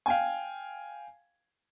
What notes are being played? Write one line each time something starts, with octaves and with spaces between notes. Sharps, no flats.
F5 G5 G#5